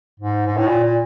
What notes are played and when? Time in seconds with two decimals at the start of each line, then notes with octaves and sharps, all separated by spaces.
0.19 G#2
0.46 G#2
0.57 A2
0.67 A#2
0.83 A#2